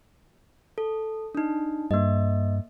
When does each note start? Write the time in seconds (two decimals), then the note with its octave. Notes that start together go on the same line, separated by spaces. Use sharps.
0.78 A4
1.35 D4 D#4
1.91 G2 A#3 D#5